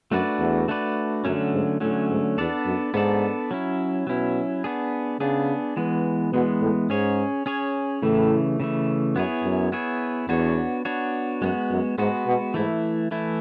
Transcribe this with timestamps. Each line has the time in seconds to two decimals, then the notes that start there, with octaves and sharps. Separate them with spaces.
0.12 F#2 A3 D4 F#4 B4 D5
0.39 E2
0.68 A3 D4 F#4 B4 D5
1.25 F#2 D3 F#3 A3 C#4
1.53 G#2
1.80 A2 D3 F#3 A3 C#4
2.10 G#2
2.38 E2 B3 D4 A4 D5
2.66 F#2
2.94 G#2 B3 D4 A4 D5
3.51 F#3 C#4 E4
4.07 B2 F#3 C#4 E4
4.64 B3 D4 G#4
5.20 C#3 B3 D4 G#4
5.77 E3 G#3 B3
6.33 B2 E3 G#3 B3
6.61 A2
6.89 G#2 C#4 G#4 C#5
7.46 C#4 G#4 C#5
8.03 A2 C#3 E3 A3
8.60 C#3 E3 A3
9.15 F#2 B3 E4 G#4 C#5
9.44 F#2
9.72 B3 E4 G#4 C#5
10.29 E2 B3 D4 F#4 C#5
10.85 B3 D4 F#4 C#5
11.41 F#2 G#3 B3 F#4
11.70 F#2
11.98 G#2 G#3 B3 F#4
12.26 B2
12.54 G#2 E3 A3 E4
13.11 E3 A3 E4